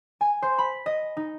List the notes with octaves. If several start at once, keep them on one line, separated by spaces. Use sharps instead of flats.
G#5
C5
B5
D#5
D#4